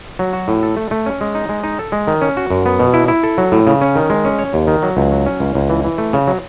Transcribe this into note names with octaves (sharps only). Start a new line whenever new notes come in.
F#3
F#4
A2
A4
A3
A3
C#4
G#3
D#4
G#3
D#4
A4
G#3
D#3
C#4
F#4
F#2
B3
B2
E4
E4
A4
F#3
A2
C#3
C#4
D#3
G#3
C#4
C#5
D#2
D#3
F#3
C#2
F#3
C#4
C#2
C#2
E3
E3
A3
C#3
F#3